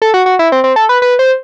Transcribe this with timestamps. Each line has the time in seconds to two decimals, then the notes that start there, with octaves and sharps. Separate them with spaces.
0.02 A4
0.14 F#4
0.26 F#4
0.39 E4
0.52 C4
0.64 C4
0.76 A4
0.89 B4
1.02 B4
1.19 C5